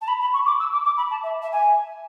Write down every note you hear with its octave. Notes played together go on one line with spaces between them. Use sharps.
A5
B5
B5
C#6
D6
E6
D6
D6
B5
A5
E5
E5
G#5